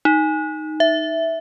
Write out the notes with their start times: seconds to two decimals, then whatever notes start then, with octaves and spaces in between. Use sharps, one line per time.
0.05 D#4
0.80 E5